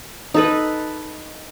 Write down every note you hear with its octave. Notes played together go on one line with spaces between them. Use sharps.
D#4 A4 B4